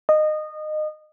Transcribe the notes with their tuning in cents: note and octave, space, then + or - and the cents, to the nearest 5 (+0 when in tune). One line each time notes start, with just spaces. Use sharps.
D#5 -20